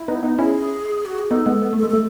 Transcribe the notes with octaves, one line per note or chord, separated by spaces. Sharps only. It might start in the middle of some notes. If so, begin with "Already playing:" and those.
Already playing: E4
B3 D#4
B3 D#4
C#4 E4 G#4
F#4
G#4
B3 D#4 A4
G#3 B3
B3
A3
A4
G#3
A3 A4